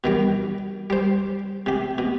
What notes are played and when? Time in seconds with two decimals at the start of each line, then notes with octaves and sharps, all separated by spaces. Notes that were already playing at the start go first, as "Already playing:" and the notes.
0.04 B2 D#3 G3
0.90 G3 C5
1.66 C3 G4
1.98 B2